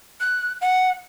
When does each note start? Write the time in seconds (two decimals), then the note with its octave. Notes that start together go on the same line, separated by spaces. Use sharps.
0.20 F#6
0.61 F#5